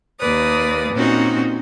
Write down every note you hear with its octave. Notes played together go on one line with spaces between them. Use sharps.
D#2 A#3 B4 D5 D#6
A#2 C4 C#4 D#4 F#4